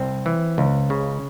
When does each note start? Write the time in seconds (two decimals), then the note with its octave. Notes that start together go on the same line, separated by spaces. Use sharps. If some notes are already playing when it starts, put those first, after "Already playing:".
Already playing: C2 C4
0.26 E3
0.58 C#2
0.90 C#3